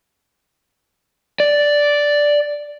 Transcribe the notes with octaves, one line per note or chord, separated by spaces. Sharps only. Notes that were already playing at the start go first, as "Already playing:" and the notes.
D5